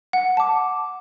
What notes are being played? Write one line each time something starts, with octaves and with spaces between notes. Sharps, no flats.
F#5
A5 D6